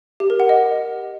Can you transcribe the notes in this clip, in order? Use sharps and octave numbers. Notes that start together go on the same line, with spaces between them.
G4
A#4
F#5
D#5